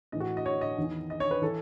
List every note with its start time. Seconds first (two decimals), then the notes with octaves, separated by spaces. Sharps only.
0.12 A2 E3 D#5
0.20 F#4
0.37 D#5
0.46 C#5
0.61 D#5
0.78 E2 D#3
1.10 D#5
1.20 C#5
1.31 B4
1.42 E3 A4